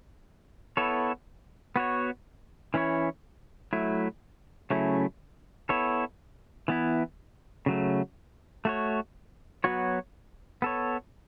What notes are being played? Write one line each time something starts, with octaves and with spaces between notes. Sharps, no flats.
B3 E4 A4 C#5
B3 F#4 C#5
E3 C#4 E4 C#5
F#3 A3 E4
C#3 F#3 A3 C#4 E4
B3 E4 A4 C#5
E3 B3 E4
C#3 F#3 A3
A3 F#4 C#5
F#3 B3 F#4 C#5
B3 A4 C#5